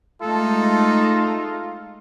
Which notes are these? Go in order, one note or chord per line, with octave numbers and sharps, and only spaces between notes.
G#3 A3 D#4 F4 A4